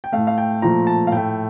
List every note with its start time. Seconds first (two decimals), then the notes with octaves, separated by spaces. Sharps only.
0.04 G5
0.12 A2 A3 F5
0.27 F5
0.38 G5
0.62 A#2 F3 A3 A#5
0.87 A5
1.07 F5
1.12 A2 A3 G5